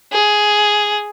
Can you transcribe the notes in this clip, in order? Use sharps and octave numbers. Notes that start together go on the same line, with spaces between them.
G#4